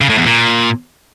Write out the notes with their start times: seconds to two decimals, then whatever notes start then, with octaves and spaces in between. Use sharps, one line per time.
0.01 C#3
0.09 A2
0.18 E2
0.26 A#2